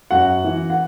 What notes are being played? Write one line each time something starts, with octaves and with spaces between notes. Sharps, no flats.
F#2 F#4 F#5
E3
F#5